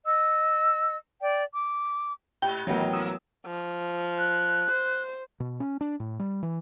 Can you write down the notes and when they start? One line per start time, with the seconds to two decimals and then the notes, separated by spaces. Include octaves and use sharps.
0.05 D#5 E6
1.21 D5 G5
1.53 D6
2.42 G#2 G4 G5
2.67 A1 A2 D#3 F#3 B3 A#4
2.93 F3 A#3 E4 D#6 E6
3.46 F3
4.19 F#6
4.71 C5
5.40 B2
5.60 C#4
5.81 D4
6.00 A2
6.19 G3
6.43 E3